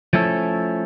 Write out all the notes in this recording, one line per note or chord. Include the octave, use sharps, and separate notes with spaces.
F3 A3 C#4 E4 A4